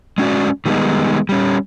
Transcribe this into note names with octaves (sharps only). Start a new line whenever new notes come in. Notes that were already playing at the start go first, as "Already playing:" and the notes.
G#3 C#4 E4 F#4 D5
D#3 G3 G#3 A#3 B3 D#4
G3 C#4